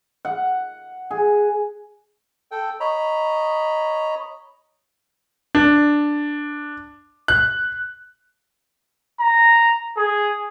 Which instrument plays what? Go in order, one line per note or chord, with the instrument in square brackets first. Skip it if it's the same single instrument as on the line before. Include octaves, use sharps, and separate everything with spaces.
[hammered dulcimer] F#5
G#4
[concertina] A4 G5
C#5 D#5 A#5 B5
[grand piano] D4
F#6
[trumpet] A#5
G#4